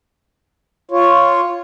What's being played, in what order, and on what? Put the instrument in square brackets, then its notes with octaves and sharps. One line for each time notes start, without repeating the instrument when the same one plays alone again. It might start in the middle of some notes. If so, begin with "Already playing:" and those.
[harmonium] F4 C#5